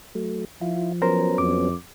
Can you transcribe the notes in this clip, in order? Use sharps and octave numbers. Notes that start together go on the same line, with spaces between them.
F#3 A3
F3 E4 F4
F#3 B3 C#4 A#4 C5 A#5
F2 D6